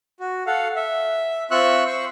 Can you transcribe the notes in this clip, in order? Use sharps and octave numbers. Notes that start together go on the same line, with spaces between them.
F#4
A4 F5 F#5
E5
C4 F4 E5 C#6 E6 F#6
C5 C#6